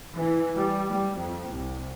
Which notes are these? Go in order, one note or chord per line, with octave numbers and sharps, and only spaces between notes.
E3
G3
G3
F2
C2